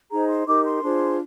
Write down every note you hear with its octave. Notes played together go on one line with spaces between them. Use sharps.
D#4 G#4 C5 A#5
C6
D#4 G4 A#4 D6
C6
D4 F4 G#4 C5